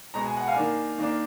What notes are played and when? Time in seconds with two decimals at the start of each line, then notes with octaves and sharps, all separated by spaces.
0.14 B2 G#3 B3 A#5
0.25 G#5
0.37 F#5
0.48 F5 G#5
0.56 D#3 A#3 D4
0.98 D#3 A#3 D4